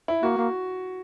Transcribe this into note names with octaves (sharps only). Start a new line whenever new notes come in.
E4
A#3 F#4
A#3